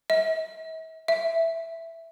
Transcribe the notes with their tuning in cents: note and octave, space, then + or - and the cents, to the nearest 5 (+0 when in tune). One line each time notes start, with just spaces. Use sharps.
E5 -45
E5 +5